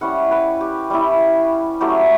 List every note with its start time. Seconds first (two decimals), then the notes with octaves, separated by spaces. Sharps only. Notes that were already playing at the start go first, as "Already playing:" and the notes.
0.01 G3 C#4 E4 F#5
0.31 B4
0.61 G4
0.90 G3 C#4 E4
1.81 F#3 A3 C#4 E4 G4